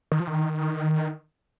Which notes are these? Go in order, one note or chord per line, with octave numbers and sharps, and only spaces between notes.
D#3
F3
D#3